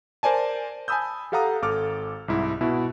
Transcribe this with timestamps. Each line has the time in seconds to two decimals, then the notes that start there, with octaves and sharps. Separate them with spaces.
0.23 A#4 C5 D5 G#5 A5
0.88 G#5 A5 B5 D#6 E6 G6
1.32 G4 A4 F5 F#5 A#5 D#6
1.62 G#1 A4 D6 F6
2.28 C2 G#2 E4
2.61 B2 E4 F#4